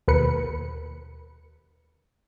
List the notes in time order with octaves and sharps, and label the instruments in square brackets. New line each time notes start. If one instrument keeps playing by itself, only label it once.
[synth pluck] D#2 B2 A#4 B4 C#7